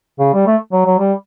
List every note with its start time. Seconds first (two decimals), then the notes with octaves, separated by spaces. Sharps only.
0.19 C#3
0.33 G3
0.47 A3
0.72 F#3
0.86 F#3
0.99 G3